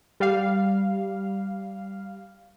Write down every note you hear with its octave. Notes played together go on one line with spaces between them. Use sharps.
G3 F5